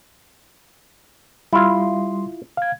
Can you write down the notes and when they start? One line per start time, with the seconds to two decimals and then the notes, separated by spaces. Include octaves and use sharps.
1.53 G3 E4 F4 C6
2.57 F5 G#6